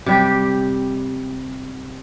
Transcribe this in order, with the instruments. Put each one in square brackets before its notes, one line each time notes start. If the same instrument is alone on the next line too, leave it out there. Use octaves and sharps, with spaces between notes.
[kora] C3 G3 G4